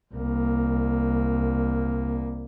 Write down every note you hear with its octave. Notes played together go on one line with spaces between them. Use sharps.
C2 A#3